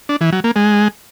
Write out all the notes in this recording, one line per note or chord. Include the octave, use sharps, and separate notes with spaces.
D4
E3
F#3
A#3
G#3